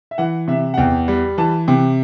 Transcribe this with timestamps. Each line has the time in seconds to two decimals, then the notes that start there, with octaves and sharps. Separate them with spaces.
0.11 E5
0.18 E3 F#5
0.48 C3 E5
0.74 F#5
0.78 E2 G5
1.08 G3
1.38 E3 A5
1.68 C3 G5